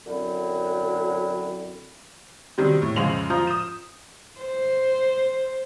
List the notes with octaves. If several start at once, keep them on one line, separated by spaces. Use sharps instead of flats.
F#2 D3 F#3 C4 E4
C3 D#3 F#3 G3 C4
A2
F2 C#3 G#3 C5 F7 F#7
F3 F4 A#5 D#6 G6
D#6 E7
C5